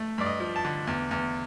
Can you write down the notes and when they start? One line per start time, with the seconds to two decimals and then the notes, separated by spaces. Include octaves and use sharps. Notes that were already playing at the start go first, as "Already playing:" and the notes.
Already playing: A3
0.18 G2 D5
0.26 D#5
0.40 F3
0.56 A5
0.65 D3
0.87 E2
1.11 E2